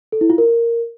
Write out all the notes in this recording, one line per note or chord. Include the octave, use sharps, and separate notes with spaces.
A4
E4
F4
A#4